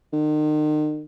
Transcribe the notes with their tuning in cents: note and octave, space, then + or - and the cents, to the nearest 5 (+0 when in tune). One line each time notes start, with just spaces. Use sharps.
D#3 -40